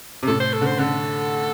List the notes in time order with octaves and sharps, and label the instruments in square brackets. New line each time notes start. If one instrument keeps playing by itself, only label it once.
[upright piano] C3
[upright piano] A2 [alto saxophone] A4
[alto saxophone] C5
A4
[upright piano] D3 [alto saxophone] C5
[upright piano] D3 [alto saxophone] A4